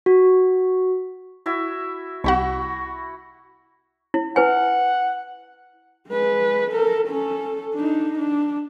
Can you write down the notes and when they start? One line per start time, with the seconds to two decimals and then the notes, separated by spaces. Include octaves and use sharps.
0.06 F#4
1.46 E4 F#4 E5
2.24 C2 F#4 G4 F#5 B5 C#6
4.14 E4
4.36 E4 B4 F#5 G#5
6.09 G#3 B4
6.70 A4 A#4
7.08 C#4 A4
7.74 D4 D#4
8.18 D4